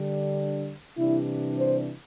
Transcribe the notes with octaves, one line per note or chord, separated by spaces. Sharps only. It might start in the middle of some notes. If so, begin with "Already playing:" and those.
Already playing: D3 G3 D4
C3 E3 G3 D4 E4
C5